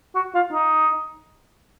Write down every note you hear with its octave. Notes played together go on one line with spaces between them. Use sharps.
F#4
F4
D#4